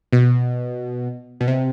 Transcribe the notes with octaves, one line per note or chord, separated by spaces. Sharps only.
B2
B2
C3